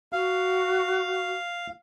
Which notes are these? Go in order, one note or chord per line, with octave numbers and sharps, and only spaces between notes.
F#4 F5